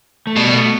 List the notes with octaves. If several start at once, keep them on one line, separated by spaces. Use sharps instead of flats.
A3
B2 G3
G3
A3